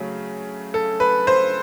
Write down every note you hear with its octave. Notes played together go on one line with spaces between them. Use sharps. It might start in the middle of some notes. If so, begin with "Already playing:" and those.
Already playing: C#3 F#3 A3
A4
B4
C5